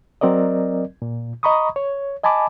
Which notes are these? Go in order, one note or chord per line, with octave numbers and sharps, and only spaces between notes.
F#3 C4 A#4 D5 D#5
A#2
D#5 A#5 B5 C#6 D#6
C#5
D#5 G#5 A5 B5 D6